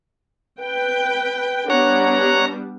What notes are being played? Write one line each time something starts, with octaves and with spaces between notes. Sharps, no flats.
B4 G5
G3 B3 D4 C#5 F#5 A#5